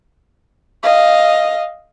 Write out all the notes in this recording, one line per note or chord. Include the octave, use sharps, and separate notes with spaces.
D#5 F5